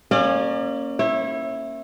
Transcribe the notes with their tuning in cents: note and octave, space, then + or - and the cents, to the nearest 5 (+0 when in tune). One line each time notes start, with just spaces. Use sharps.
A#3 +0 C#4 -15 D5 +40
E4 +0 C#5 -35